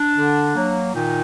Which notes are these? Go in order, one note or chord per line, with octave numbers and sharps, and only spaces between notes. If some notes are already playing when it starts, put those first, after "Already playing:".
Already playing: D4
D3
F#3 A#3
A#2 D#3 D#4